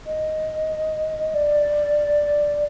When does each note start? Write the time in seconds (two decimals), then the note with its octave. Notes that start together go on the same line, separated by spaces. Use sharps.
0.07 D#5
1.35 D5